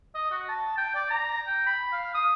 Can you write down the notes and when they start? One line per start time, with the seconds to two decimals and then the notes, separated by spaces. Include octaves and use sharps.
0.15 D#5
0.31 F#4
0.49 A5
0.78 G5
0.95 D5
1.10 A#5
1.47 G5
1.66 B5
1.93 F5
2.15 D#6